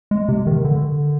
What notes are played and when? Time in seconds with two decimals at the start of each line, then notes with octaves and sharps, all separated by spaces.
0.11 G#3
0.29 C3
0.47 D#3
0.65 D3